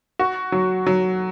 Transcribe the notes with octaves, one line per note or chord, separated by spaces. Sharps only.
F#4
F#3
F#3